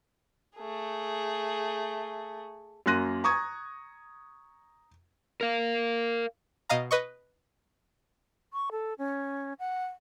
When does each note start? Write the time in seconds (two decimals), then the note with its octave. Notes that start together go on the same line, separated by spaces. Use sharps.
0.57 A3 G#4
2.86 F#2 A#3 C6 F#6 A#6 D#7
3.24 A#5 C#6 D#6 G#6
5.41 A#4 F5
6.69 B2 D#5 F5 A#5
6.91 B4 D#5 C#6
8.53 C#6
8.72 A4
8.98 C#4
9.59 F#5